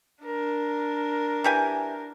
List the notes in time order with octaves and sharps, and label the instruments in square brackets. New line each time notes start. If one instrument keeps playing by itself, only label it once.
[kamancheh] D4 A#4
[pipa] E3 G4 G#5